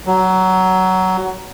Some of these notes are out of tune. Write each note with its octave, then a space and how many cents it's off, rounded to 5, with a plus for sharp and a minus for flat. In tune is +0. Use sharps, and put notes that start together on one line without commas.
F#3 +15